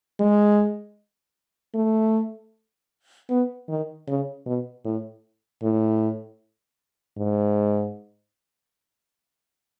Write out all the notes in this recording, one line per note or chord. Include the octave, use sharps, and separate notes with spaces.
G#3
A3
B3
D#3
C#3
B2
A2
A2
G#2